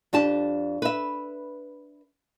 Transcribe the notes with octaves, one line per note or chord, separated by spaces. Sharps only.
F2 D4 G4 A5
B4 E5